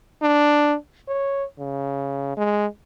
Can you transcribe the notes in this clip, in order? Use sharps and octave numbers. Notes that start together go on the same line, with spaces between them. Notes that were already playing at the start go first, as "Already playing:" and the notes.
D4
C#5
C#3
G#3